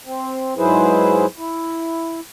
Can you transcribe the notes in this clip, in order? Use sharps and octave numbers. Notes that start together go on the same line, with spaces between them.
C4
G#2 F#3 E4 G#4 B4 C5
E4